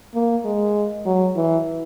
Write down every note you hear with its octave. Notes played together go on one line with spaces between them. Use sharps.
A#3
G#3
F#3
E3